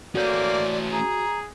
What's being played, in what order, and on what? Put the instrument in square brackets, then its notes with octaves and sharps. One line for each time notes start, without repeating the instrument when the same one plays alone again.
[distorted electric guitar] A3 C#4 [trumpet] A#3 [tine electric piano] F#4 G6 [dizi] D5
[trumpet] G#4 [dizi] A#5